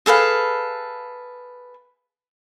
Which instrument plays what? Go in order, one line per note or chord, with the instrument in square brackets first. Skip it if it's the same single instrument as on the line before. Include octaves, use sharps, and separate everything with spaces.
[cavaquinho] G#4 A4 B4 F5